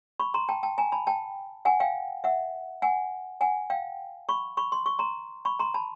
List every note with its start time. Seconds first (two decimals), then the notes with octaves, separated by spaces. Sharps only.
0.20 B5 C#6
0.34 A#5 C6
0.49 G5 A5
0.63 G5 A5
0.78 G#5 A#5
0.92 A5 B5
1.07 G5 A5
1.65 F#5 G#5
1.80 F5 G5
2.24 E5 F#5
2.82 F#5 G#5
3.41 F#5 G#5
3.70 F5 G5
4.29 B5 C#6
4.57 B5 C#6
4.72 C6
4.86 C#6
4.99 A#5 C6
5.45 B5 C#6
5.59 A#5 C6
5.74 A5 B5